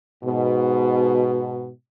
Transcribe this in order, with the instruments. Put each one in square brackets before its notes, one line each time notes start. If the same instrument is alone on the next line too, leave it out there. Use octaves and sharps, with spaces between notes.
[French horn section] G#2 B2